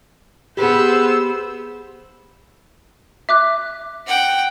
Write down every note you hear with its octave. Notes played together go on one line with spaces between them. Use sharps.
B3 G4 G#4 C5 E6
E5 D6 F#6
F#5 G5